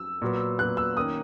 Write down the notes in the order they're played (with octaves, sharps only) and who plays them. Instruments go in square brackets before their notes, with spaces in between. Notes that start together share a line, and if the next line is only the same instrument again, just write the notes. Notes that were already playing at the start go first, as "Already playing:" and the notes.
Already playing: [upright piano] E6
[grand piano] A#2 F#3 B3
[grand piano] A#2 F#3 B3 [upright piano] F#6
[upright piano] E6
[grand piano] D#3 A#3 C#4 [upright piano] D#6